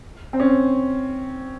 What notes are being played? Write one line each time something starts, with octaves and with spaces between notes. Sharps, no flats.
C4
C#4